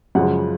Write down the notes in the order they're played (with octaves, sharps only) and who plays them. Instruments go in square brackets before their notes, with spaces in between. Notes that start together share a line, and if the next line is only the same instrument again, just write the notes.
[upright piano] F#2 C#3 F3 G#3 F#5